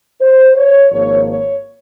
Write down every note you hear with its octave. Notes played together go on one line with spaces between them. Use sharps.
C5
C#5
G#1 G#2 F3 A#3 C#5
C#5